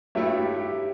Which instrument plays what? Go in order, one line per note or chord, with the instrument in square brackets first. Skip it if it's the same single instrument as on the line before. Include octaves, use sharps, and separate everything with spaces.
[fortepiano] G2 F#3 A3 E4 [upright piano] C#5 E5
[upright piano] G4
G4